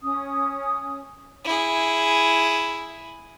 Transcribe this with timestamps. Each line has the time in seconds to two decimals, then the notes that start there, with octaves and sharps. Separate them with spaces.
0.01 C#4 D#6
1.45 E4 G#4